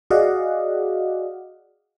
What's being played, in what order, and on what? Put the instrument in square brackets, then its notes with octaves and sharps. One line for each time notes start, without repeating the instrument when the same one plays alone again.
[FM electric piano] F#4 G#4 D5 D#5 F5 F#5